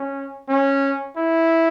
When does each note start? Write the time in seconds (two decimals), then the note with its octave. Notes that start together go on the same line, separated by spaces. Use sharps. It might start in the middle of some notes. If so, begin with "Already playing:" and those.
Already playing: C#4
0.49 C#4
1.17 E4